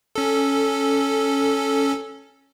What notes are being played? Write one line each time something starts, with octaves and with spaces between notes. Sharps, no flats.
C#4 A4